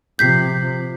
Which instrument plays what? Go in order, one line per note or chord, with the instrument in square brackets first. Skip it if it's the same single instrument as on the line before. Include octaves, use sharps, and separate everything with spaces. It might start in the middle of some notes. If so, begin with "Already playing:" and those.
[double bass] C3 F3 [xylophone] G6 B6 C7